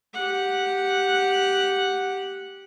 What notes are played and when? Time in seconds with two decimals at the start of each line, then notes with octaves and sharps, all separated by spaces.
0.13 G4 F#5